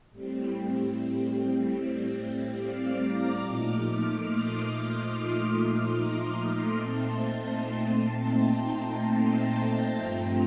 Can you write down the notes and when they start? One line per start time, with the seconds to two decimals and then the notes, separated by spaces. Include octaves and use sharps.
0.11 A2 G3 C4
2.56 D5 F5
2.97 A#5 D6
3.37 A#2 F3 A3 D#4 D6 F6
4.19 C6 D#6
5.02 D6 F6
5.42 C6 D#6
5.84 A#5 D6
6.65 A#2 A3 C4 D#4 A5 C6
7.47 A5 C6
8.30 G5 A#5
9.93 G2 F3 A3 C4 F4